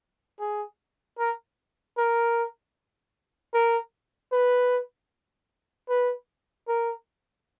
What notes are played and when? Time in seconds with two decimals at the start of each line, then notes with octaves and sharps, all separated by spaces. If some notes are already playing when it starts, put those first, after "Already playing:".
0.39 G#4
1.19 A#4
1.98 A#4
3.54 A#4
4.32 B4
5.89 B4
6.68 A#4